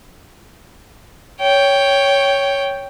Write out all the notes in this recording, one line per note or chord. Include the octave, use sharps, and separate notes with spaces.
C#5 G5